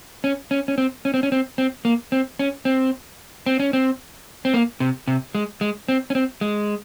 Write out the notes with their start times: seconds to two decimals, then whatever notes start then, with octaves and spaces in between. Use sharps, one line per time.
0.24 C#4
0.51 C#4
0.68 C#4
0.78 C4
1.05 C#4
1.14 C4
1.23 C#4
1.32 C4
1.58 C4
1.85 A#3
2.12 C4
2.39 C#4
2.65 C4
3.46 C4
3.60 C#4
3.73 C4
4.45 C4
4.54 A#3
4.80 C3
5.08 C3
5.35 G#3
5.61 G#3
5.88 C4
6.10 C#4
6.15 C4
6.41 G#3